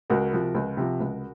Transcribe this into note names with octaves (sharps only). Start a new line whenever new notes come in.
C#2 F#4 A#4
C3 F3
C#2
C3 F3
C#2